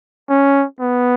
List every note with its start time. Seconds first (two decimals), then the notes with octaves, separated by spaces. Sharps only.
0.30 C#4
0.80 B3